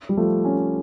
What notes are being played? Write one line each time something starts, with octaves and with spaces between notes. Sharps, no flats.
G3
F3 A3
A3 C#4